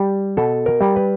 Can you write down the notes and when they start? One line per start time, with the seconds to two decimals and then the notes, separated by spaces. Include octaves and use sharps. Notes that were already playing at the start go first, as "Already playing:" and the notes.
Already playing: G3
0.37 B2 A4
0.66 A#4
0.81 G3
0.96 B4